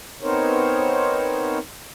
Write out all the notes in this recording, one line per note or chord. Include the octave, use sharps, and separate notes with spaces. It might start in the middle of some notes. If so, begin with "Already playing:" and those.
B3 C4 D#4 A#4 C5 C#5